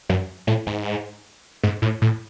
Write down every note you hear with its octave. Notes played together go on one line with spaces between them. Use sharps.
F#2
A2
G#2
G#2
A2
A2